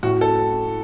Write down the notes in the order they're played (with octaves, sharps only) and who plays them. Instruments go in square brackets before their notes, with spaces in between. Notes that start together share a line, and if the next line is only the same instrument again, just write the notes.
[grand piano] A2 [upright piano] F#4
[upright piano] A4